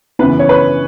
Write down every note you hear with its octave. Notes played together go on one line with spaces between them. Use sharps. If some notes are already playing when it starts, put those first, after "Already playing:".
F#2 C#3 E3 B3 B4
C#5
B4